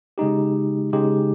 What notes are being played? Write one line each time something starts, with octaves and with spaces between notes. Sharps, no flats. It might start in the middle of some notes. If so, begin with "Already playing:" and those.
C#3 G#3 D#4 G4
C#3 G#3 D#4 G4